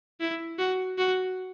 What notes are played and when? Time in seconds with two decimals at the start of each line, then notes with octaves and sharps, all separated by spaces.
0.21 E4
0.59 F#4
0.98 F#4